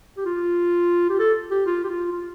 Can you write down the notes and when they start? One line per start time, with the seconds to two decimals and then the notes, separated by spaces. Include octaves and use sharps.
0.17 G4
0.25 F4
1.10 G4
1.19 A4
1.51 G4
1.66 F4
1.84 G4
1.88 F4
2.12 F4